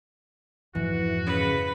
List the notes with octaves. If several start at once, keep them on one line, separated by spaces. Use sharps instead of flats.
F2 G#2 E3 F#4
C#3 B4